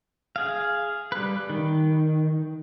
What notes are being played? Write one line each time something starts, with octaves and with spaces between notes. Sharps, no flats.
G#4 F5
G3 B4
D#3